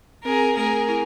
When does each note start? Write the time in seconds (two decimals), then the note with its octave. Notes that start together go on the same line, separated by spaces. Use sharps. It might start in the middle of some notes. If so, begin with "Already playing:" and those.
0.24 C4 G#4 A#4
0.57 A3 G#4 A#4
0.89 E4